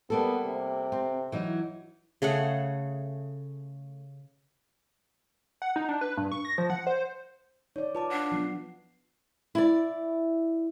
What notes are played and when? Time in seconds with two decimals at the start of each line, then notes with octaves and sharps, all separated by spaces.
0.10 G3 A#3 B3 A4
0.46 C3
0.92 C4
1.32 E3 F#3 D#4
2.22 C#3 A3 G#4 F#5
5.62 F#5
5.76 D#4
5.89 D4
6.01 B4
6.17 G2
6.32 C#6
6.45 A#6
6.58 F3
6.70 F#5
6.87 C5
7.76 D#4 C#5 D5
7.95 F4 B4 A5 D6
8.11 D4 F#5
8.32 F3 F#3 B3 C7
9.55 E4 D5